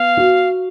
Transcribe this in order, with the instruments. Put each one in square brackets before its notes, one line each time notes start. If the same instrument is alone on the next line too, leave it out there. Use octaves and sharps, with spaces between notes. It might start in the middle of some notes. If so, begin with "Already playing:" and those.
Already playing: [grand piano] B3 [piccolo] F5
[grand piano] F#4